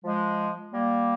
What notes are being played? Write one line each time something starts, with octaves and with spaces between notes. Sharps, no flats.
F3 G#3
G3 A#3